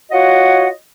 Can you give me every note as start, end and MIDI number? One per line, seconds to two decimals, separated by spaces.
0.11 0.68 65
0.11 0.68 66
0.11 0.68 73
0.11 0.68 75
0.11 0.68 78